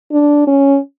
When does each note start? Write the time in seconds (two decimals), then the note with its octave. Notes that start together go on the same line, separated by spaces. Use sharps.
0.12 D4
0.47 C#4